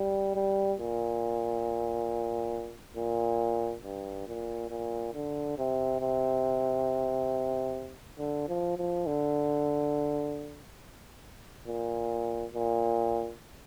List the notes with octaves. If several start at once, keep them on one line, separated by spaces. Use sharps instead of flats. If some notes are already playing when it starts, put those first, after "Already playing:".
Already playing: G3
G3
A#2
A#2
G2
A#2
A#2
D3
C3
C3
D3
F3
F3
D3
A#2
A#2